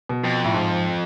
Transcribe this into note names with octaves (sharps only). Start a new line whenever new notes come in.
B2
F2
A2
G#2